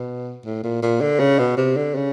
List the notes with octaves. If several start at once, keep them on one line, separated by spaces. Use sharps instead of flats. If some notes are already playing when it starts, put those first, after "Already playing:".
Already playing: B2
A2
A#2
A#2
D3
C#3
B2
C3
D3
C#3